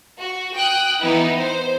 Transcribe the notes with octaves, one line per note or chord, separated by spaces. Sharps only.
F#4
G5 D#6 F#6
E3 B3 D#4 E4
C5